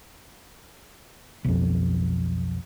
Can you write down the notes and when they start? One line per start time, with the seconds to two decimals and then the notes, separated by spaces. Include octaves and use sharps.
1.45 B1 F2